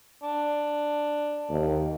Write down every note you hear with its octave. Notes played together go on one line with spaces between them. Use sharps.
D4
D#2